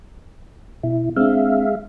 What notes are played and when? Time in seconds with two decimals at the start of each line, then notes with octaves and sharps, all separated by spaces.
0.83 B2 E4
1.17 G#3 C4 D4 E5 F5